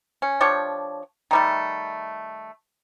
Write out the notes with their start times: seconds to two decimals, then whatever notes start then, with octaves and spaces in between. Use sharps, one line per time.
0.22 C#4
0.41 F3 D4 G4 C#5
1.31 D#3 G3 A3